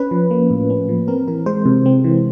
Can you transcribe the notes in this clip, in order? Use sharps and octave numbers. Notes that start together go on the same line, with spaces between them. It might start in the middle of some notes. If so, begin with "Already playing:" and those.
Already playing: C#4 B4
F3
A#3
A2
C#4
F3
C4 A#4
E3 A#4
G#3 C5
C3
C4
E3